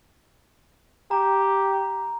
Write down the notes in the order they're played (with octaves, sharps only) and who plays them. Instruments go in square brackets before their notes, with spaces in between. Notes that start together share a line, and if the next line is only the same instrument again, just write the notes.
[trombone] G4 [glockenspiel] A#5